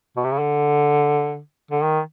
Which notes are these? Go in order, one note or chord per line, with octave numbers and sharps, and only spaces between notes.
B2
C3
C#3
D3
D3
D#3